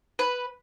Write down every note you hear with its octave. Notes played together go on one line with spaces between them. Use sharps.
B4